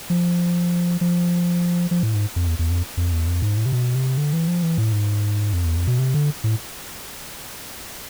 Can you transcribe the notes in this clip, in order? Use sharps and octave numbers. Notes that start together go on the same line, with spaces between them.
F3
F3
F3
A2
G#2
F2
E2
E2
F2
F2
E2
F2
G#2
A2
C3
B2
C3
D3
E3
F3
E3
A2
G#2
F2
E2
F2
B2
C3
D3
A2